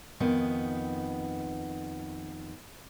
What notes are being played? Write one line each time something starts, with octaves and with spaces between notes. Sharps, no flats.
F2 D#3 B3